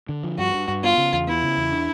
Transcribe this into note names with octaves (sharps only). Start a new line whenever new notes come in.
D3
F3
G2 F#4
G2
G2
B3 F4
C#3
E2
B3 E4
C#3
E2
D4